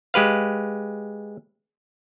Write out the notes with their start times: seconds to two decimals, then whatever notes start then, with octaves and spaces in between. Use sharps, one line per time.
0.14 G#3 G4 B4 F5